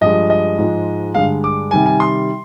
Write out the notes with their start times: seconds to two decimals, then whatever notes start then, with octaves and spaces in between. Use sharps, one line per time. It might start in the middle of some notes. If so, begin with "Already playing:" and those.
0.01 G2 F3 G#3 D#5
0.30 D#5
0.59 G#2 F3 G#3
1.14 G2 D3 G#3 F5
1.44 D6
1.71 C3 D#3 G3 G#5
1.86 G#5
2.00 C6